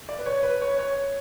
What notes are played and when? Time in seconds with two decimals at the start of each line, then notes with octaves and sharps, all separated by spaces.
0.09 D5
0.19 B4
0.26 C#5
0.43 B4
0.62 C#5
0.79 C#5